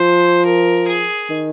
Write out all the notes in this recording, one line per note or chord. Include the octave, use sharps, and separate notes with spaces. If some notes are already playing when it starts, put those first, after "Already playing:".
Already playing: F3 C5
A#4
G#4
D#3